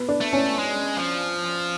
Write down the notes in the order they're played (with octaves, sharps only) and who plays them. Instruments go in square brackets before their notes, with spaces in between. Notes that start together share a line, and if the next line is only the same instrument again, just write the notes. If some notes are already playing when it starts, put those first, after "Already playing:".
Already playing: [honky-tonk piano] B3
D4
[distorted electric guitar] A3
[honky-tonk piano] C#4
[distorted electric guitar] G#3
F3